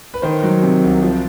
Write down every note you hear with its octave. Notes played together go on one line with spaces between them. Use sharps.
B4
D#3 C5
F#3
C3
C2
F3